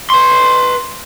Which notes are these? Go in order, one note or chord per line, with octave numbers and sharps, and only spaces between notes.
B4 C6